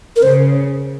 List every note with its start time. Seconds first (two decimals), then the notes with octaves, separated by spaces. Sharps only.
0.16 A#4
0.23 C#3 C5